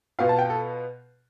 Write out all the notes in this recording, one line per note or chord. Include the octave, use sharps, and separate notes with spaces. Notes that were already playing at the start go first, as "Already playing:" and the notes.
B2 B3 F4 F5
A5
G5
A4